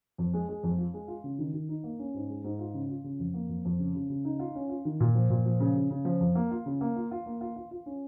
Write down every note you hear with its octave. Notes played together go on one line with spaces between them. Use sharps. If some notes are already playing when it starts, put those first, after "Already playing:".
F2
G#3
G#3
F2
F4
G#3
F4
C#3
D#3
D#3
D#4
A#3
C#4
G#2
G#3
G#2
F4
C#3
F4
C#3
F2
A#3
F2
F2
C#3
C#3
C#3
D#4
F4
C#4
F4
D#3
A#2
F3
A#2
F3
C#3
C#3
C#3
F3
F2
A#3
F4
C#3
A#3
F4
F4
A#3
F4
F4
F4
C#4